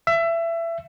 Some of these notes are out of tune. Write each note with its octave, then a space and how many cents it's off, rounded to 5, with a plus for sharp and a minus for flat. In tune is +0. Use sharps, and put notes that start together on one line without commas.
E5 +25